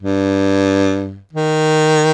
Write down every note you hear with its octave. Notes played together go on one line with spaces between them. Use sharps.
G2
D#3